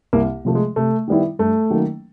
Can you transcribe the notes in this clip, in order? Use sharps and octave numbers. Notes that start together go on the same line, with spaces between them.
C2 A#3
C3 F3 A3
G#3
C3 A3
D#3 G3 B3 E4
G2 A3
D#3 F#3 A#3 C#4